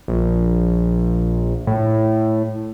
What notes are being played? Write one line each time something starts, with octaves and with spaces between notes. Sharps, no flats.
A#1
A2